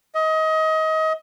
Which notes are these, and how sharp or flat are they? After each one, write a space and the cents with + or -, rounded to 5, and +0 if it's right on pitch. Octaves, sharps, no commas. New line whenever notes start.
D#5 +25